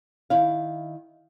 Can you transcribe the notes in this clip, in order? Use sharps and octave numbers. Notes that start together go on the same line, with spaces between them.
D#3 E4 F5